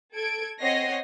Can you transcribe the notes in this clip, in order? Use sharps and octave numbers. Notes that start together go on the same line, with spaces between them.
A4 G#6 D7
C4 C#5 D#5 F#5 A#6 C7